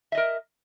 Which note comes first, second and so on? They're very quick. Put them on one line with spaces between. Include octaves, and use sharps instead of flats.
E5 D#5 A#4